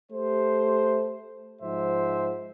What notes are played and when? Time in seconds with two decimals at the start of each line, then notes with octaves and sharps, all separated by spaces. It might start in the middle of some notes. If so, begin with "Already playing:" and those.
0.11 A3 G4 C5
1.62 G#2 F3 C5 E5